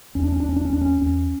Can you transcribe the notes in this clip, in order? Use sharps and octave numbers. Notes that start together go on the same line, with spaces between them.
E2 C#4
D4
C#4
D4
E2
C#4
D4
C#4
E2 D4
C#4
E2 C#4